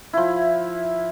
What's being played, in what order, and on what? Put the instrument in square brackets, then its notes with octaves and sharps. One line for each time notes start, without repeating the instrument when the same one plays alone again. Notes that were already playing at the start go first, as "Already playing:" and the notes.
[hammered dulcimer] F3 E4